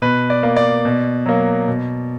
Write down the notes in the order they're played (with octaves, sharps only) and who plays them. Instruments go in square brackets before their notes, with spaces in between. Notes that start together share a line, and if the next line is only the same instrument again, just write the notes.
[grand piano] B2 B4
D5
A#3
D5
B2
F#3 A#3
B2